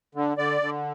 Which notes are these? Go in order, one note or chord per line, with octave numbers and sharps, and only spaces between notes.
D3
D3 D5
D3